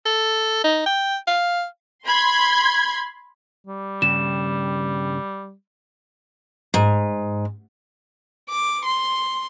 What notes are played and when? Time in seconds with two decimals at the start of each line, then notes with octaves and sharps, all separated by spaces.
0.06 A4
0.64 D#4
0.86 G5
1.28 F5
2.07 B5 C6 G#6
3.67 G3
4.02 G2 C#3 E7
6.74 G#2
8.49 D6
8.86 C6